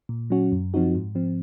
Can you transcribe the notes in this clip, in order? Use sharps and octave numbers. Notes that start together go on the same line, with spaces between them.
A#2
F#3 C#4 F#4
F#2
F3 C4 D#4 F#4
G#2
F3 C4